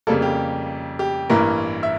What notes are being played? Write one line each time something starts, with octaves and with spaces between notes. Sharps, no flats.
F2 C#3 G3 A#3 A4
G4
G4
A1 G2 E3 A#3 A#4
E5